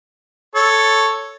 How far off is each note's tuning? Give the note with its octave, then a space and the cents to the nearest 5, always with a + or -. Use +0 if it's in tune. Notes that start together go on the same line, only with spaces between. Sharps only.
A4 +0 C#5 +0